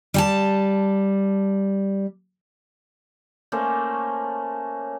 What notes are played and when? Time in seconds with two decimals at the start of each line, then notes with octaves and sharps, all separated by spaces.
0.14 G3 G#5 A5
3.52 A3 A#3 C#4 C5